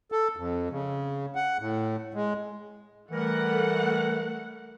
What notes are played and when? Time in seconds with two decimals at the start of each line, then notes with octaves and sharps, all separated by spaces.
0.12 A4
0.37 F2
0.70 C#3
1.35 F#5
1.59 A2
2.14 G#3
3.11 E3 G3 A3 A#4 F#5